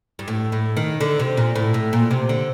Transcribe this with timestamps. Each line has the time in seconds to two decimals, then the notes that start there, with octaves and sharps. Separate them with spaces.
0.19 G2
0.28 A2
0.52 A2
0.77 D#3
1.01 D3
1.19 C3
1.37 A#2
1.56 A2
1.74 A2
1.93 A#2
2.11 C3
2.29 D3